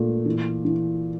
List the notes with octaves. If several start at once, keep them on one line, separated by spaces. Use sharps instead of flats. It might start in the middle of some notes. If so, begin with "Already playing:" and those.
Already playing: A#2 A3
E3
E3